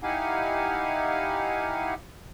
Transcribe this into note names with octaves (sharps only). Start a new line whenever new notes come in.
D#4 E4 G4 F5 F#5 G#5